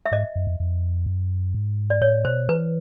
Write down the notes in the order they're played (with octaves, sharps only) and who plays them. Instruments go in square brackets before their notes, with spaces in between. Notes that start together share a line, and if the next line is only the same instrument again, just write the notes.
[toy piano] E5
[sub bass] G#2 [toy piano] D#5
[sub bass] F#2
F2
F2
F#2
G#2
[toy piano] D5
[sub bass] A2 [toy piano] C#5
[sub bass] B2 [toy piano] C5
[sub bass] E3 [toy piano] B4